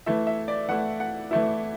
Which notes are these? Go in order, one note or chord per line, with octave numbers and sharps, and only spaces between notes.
E3 A3 E4 E5
E5
D5
E3 A3 E4 F#5
F#5
E3 A3 E4